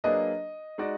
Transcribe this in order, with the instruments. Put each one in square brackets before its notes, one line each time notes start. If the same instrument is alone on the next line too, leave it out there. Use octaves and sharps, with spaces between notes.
[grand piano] F#3 A#3 D4 G#4 B4 [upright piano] D#5
[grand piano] G#3 D#4 F#4 D5